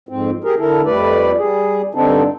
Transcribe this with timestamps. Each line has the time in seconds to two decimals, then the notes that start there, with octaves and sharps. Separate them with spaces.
0.09 F2 G#2 C4
0.44 G4 G#4 A#4
0.59 D3 E4 A4 A#4
0.85 F2 G3 A3 B4 D5
1.38 G3 G#4
1.95 G2 D3 C4 D4 D#4 A4